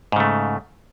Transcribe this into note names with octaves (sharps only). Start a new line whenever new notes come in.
G#2 C#3 A3